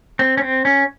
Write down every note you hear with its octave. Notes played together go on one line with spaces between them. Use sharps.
C4
C#4
C4
C#4